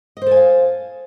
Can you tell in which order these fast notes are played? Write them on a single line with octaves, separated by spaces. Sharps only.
D#5 C5 A4 G#5 F5